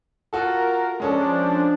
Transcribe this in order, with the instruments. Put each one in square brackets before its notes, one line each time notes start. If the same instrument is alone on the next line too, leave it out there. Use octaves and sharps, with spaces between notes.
[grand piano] F4 F#4 A4 [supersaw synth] A#4
[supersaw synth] F3 D4 [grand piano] G#3 C#4 A4